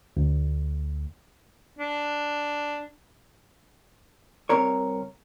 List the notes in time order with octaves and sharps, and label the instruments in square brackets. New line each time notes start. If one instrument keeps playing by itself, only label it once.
[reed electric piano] D2
[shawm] D4
[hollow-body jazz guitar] C2 C3 A#4 C#5